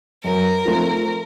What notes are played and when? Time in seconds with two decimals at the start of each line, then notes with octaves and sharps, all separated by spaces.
0.24 F#2 A#4
0.65 F3 A3 C4